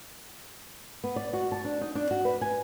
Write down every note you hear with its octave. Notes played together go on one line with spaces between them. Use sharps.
B3
D5
F#4
A5
D4
D#4
D4
F#4
B4
G#5